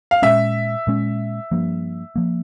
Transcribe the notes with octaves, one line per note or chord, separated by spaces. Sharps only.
F5
A#2 G#3 C#4 E5
A#2 G#3 C#4
G2 F3 A#3
F3 A#3